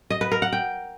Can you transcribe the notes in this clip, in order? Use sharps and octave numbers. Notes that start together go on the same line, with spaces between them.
D#5
B4
A#4
F#5
G5